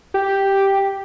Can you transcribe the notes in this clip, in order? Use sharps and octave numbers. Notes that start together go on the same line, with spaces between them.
G4